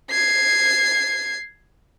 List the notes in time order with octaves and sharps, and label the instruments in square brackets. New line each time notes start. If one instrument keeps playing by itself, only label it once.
[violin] G#6 C7